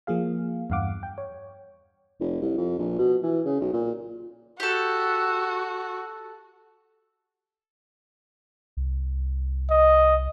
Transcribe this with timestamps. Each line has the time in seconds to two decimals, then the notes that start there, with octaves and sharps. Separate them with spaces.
0.07 F3 A#3 G#4 F5
0.70 E2 G2 F5 F#5 D6
1.03 G5
1.18 C#5
2.20 F1
2.41 C2
2.58 F2
2.79 A#1
2.99 B2
3.23 E3
3.45 C#3
3.60 B1
3.73 A#2
4.60 F#4 G4 A4
8.77 C2
9.70 D#5